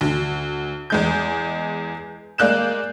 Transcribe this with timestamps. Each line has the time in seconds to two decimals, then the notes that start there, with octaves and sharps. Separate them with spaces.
0.01 D2
0.90 E2 G#3 G6
2.38 G#3 A#3 D5 F#6 G6 E7